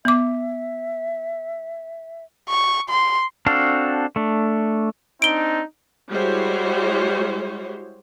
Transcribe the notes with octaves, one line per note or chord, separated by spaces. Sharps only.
B3 E5 D6
C#6
C6
C4 D4 F#4 A4 F5
A3 D4
C4 D4 D#4 D7 G7
G3 G#3 E4 F#4 C5 C#5